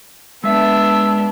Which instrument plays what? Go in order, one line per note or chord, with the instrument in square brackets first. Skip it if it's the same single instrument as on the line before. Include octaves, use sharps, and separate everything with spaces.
[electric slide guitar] G#3 E5 [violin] B3 D4 [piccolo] E6